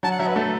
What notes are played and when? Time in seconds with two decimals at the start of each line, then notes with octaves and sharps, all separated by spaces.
0.03 F#3 A5
0.11 F#5
0.20 F#3 E5
0.28 B4
0.36 A3 A4